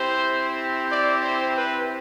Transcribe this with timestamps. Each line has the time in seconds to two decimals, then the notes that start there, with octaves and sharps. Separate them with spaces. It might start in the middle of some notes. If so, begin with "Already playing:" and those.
Already playing: C4 E4 G4 C5
0.91 D5
1.23 C5
1.56 B4